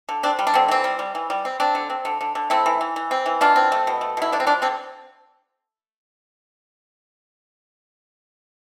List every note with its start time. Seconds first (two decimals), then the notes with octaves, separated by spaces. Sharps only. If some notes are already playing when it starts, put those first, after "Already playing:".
0.09 D3
0.23 C4 D4
0.39 G3
0.47 D4
0.54 D3 C4
0.68 E3 C4
0.84 G3
0.99 G3
1.15 E3
1.30 G3
1.45 C4
1.60 C4 D4
1.75 D3
1.90 C4
2.05 D3
2.21 D3
2.35 D3
2.50 A3 C4 E4
2.66 E3
2.81 E3
2.96 E3
3.11 C4
3.26 E3
3.41 B2 D4 F4
3.56 C4
3.72 A3
3.87 B2
4.01 A3
4.17 B2 E4
4.32 D3 D4
4.40 C4
4.47 F3 D4
4.62 D3 C4